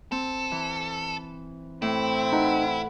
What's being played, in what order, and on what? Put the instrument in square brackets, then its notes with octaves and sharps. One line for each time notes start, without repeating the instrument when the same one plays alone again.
[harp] C4 [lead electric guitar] A4
[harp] E3
[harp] A2 [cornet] C4 [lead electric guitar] E4
[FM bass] D#4 [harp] B4 F#5